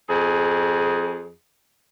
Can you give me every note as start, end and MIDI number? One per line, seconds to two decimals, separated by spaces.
0.09 1.32 41
0.09 1.32 68